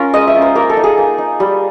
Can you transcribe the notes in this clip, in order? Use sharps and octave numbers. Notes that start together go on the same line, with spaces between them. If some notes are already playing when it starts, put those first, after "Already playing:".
Already playing: C#4 F4 A#4
G#3 D#5
E5
C#4 F4
C5
A#3 A#4
A4
D#4
G#4
A#3
D#4
G3